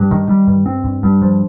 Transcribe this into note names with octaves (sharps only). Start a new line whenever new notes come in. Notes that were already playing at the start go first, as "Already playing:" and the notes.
Already playing: G2
D#3
G3
G2
C4
G2
G2
F3